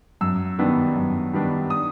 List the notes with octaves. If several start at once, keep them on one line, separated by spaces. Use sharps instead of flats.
F#2 E6
D#3 G3 B3 D4
F#2
D#3 G3 B3 D4
D#6